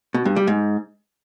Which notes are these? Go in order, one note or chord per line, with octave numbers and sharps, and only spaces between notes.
B2
G2
G3
G#2